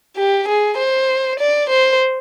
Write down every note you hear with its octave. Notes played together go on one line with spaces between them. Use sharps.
G4
G#4
C5
D5
C5